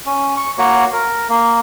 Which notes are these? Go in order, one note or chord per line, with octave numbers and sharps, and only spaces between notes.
C#4
C#6
A#3 F#4 C#5 C#6
A#4
A#3